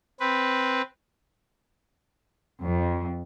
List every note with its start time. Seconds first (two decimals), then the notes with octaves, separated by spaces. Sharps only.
0.20 C4 B4
2.62 F2